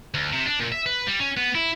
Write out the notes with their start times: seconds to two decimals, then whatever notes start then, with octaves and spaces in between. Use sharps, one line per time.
0.14 D2
0.33 C3
0.46 D4
0.60 A#2
0.72 E5
0.86 B4
1.07 G3
1.20 C#4
1.37 B3
1.55 E4